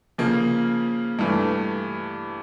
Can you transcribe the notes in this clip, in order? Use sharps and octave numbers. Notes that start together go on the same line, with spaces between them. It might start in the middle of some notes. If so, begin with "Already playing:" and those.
C#3 F3 A#3
G2 E3 A3